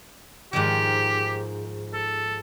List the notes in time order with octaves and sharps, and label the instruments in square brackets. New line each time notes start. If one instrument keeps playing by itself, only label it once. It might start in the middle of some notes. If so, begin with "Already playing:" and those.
[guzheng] G#2 D#3 F3 [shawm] G4
[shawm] A4